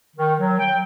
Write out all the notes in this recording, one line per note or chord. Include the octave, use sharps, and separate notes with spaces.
D#3
F#3
G5